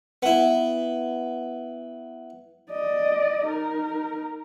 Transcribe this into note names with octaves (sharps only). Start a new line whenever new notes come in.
B3 E4
D5 D#5
D#4 A#4